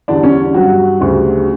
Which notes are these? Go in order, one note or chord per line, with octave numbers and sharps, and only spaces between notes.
E2 D3 G3 D4
C#4
G2 F#3 F#4
D2 C#3 G3